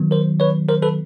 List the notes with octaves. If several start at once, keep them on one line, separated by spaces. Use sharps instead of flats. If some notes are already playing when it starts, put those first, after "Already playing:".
Already playing: D#3 F#3 B3
A#4 C5
B4 C#5
A#4 C5
A4 B4